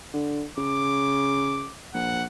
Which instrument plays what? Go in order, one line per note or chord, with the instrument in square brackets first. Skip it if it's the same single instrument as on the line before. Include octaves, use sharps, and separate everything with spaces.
[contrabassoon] D3
[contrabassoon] C#3 [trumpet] D6
[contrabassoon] A#1 [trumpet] F#5